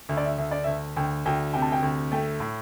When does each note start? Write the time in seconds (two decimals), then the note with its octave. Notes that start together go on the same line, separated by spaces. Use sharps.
0.09 D2 E5
0.17 D5
0.25 E5
0.38 D2 E5
0.51 D5
0.64 D2 E5
0.96 D2 G5
1.26 D2 G5
1.53 C3 G5
1.62 A5
1.72 G5
1.82 D2
2.12 A3 G5
2.40 A2